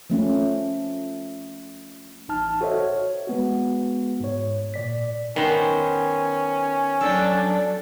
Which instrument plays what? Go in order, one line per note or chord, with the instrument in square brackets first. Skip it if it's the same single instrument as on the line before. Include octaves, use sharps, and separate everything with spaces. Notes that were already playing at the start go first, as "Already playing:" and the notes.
[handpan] F3 A3 C#4
[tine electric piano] A1 D#4 A5 F6
F#4 A4 C5 C#5 D#5 E5
C#5
G#3 B3 F#4
G#2 C#5
A#2 D5 B6
[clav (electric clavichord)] D#3 [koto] B3 C5 [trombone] C#4
[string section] F#3 D4 [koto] A4 G5